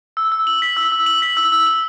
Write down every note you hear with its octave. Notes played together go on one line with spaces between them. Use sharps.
E6
E6
F#7
B6
E6
E6
F#7
B6
E6
E6
F#7